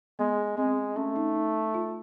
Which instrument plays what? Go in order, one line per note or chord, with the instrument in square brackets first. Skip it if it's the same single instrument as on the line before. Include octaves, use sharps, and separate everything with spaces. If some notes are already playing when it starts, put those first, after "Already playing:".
[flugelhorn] G#3 [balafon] B3
[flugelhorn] G#3 [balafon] C4
[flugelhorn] A3 [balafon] C#4
[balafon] D#4
D#4
F4